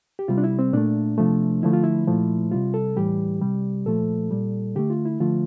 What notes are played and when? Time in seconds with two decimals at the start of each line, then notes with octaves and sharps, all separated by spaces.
0.19 G4
0.28 C3 G3 F4
0.38 D4
0.44 E4
0.59 C4
0.73 A#2 A3 D4
1.18 C3 F3 A3
1.63 D3 F3 A3 E4
1.73 F4
1.84 E4
2.07 A#2 F3 A3
2.52 C3 G3 F4
2.74 A4
2.97 A2 E3 G3 G4
3.42 C3 G3
3.86 A#2 F3 A3 A4
4.31 A#2 G3
4.75 D3 A3 G4
4.90 F4
5.05 E4
5.20 D3 F3 A3 F4